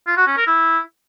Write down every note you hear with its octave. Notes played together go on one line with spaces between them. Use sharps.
F4
F#4
C#4
A#4
E4